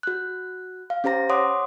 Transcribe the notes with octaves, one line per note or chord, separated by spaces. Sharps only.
F#4 F#6
F5
C#4 G4 C5 A#5 A#6
C#5 F#5 C6 D6 D#6